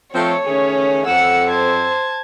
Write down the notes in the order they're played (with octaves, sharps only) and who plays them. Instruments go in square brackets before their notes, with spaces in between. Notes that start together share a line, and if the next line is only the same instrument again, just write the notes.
[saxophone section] F3 A3 C4 [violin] A4 [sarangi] C#5
[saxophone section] D#3 A3 G#4 [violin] C#4
[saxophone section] F2 A4 [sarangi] F#5 [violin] E6 C#7
[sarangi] C5 [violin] A5 G#6